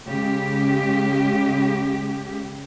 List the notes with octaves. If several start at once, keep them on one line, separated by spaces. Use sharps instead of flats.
C#3 G#3 G4